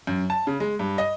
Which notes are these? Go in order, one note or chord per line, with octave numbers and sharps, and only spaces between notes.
F#2
A5
C#3
G#3
G2
D#5